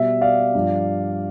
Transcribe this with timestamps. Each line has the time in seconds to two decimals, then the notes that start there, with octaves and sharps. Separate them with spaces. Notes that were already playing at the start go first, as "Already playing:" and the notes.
Already playing: B2 G3 E5
0.21 D5 F5
0.55 G2 F3